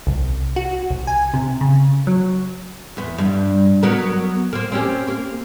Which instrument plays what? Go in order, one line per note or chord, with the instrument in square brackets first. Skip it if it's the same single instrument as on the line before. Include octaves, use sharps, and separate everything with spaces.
[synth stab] C2
F#4
C2
G#5
C3
C#3
F#3
[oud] E2 B3
G2
F#3 B3 A#4
A#3 C4
C4 C#4 G4
A#3